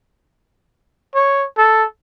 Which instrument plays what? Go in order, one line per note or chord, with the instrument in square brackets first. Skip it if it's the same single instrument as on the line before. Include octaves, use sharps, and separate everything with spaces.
[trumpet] C#5
A4